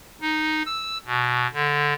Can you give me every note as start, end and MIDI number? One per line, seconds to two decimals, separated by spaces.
0.21 0.63 63
0.66 0.98 88
1.06 1.47 47
1.53 1.94 50